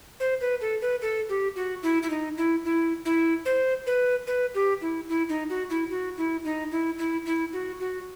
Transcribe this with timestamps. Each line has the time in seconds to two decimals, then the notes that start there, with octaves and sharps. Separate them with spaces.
0.20 C5
0.41 B4
0.61 A4
0.82 B4
1.02 A4
1.29 G4
1.56 F#4
1.83 E4
2.03 E4
2.10 D#4
2.37 E4
2.65 E4
3.05 E4
3.45 C5
3.87 B4
4.27 B4
4.55 G4
4.82 E4
5.09 E4
5.29 D#4
5.50 F#4
5.70 E4
5.91 F#4
6.18 E4
6.45 D#4
6.72 E4
6.99 E4
7.26 E4
7.53 F#4
7.80 F#4